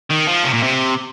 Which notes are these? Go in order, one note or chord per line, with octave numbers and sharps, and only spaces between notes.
D#3
F3
C3
A#2
C3